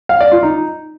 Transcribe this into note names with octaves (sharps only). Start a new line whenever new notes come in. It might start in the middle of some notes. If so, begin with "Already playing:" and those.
F5
D5
F4
D#4